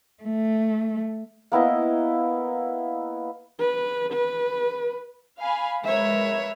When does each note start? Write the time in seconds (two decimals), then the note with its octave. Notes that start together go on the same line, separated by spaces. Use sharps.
0.23 A3
1.52 A#3 B3 E4 D#5
3.59 B4
4.12 B4
5.41 F5 G#5 B5
5.84 G#3 A#4 B4 C#5 E5